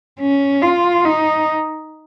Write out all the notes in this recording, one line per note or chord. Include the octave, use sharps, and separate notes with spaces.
C#4
F4
D#4